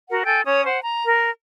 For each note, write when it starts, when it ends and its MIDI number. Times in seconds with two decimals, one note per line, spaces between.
0.11 0.23 66
0.11 0.23 70
0.11 0.23 78
0.25 0.42 69
0.25 0.42 79
0.25 0.42 80
0.45 0.64 61
0.45 0.64 73
0.45 0.64 87
0.65 0.80 72
0.65 0.80 78
0.83 1.04 82
1.06 1.30 70